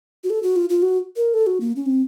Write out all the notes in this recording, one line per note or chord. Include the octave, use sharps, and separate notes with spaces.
F#4
A4
F#4
F4
F4
F#4
A#4
A4
F#4
A#3
C#4
C4